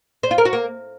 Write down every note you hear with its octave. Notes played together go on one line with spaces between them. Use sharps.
C5
F4
A#4
F#4
A#3